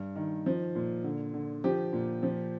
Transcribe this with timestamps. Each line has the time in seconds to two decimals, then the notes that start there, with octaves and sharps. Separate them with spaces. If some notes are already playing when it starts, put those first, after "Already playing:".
Already playing: G2
0.16 D#3
0.46 F3
0.75 A#2
1.04 D3
1.34 D3
1.64 F3 G4
1.93 A#2
2.23 F3